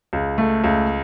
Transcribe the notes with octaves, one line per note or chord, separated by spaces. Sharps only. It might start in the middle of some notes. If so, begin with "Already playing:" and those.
C#2
A3
C#2